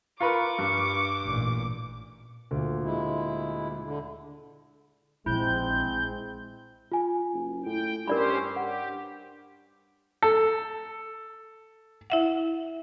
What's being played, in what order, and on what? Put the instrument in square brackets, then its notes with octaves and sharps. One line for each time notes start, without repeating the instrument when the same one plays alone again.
[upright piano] F4 A#4 B4 [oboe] C#6 [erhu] D6
[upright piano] G2
[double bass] A1 A#2
[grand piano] D2 A#2
[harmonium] G#3 E4
D3
[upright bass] A#1 [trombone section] G#3 C4 [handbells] E4 [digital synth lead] G6
[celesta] F4 G#5
[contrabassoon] F#1
[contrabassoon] A2 [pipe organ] G5
[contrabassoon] G2 [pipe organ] C#4 G4 C5 [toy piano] A#4 D5 B5
[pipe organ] G4 [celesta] F#5
[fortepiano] A4
[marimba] E4 E5 F#5